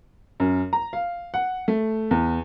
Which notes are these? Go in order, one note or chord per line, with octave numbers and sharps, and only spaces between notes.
F#2
A#5
F5
F#5
A3
E2